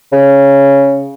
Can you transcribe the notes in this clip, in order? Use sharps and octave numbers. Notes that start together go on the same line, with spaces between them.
C#3